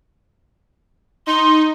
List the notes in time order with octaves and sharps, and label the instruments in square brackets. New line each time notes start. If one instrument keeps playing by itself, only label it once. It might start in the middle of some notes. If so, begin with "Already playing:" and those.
[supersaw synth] D#4 [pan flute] C6